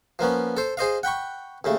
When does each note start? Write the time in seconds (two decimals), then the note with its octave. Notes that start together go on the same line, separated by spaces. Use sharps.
0.19 F3 A#3 B3 C#4
0.57 A4 C5
0.77 G#4 C5 D#5 F5
1.03 F#5 G5 B5 C#6
1.64 D#2 C#3 A3